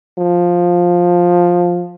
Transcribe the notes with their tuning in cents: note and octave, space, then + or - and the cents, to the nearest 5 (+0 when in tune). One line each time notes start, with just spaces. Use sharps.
F3 +10